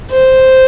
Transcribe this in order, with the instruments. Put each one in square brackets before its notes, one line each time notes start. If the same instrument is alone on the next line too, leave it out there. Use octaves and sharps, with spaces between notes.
[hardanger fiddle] C5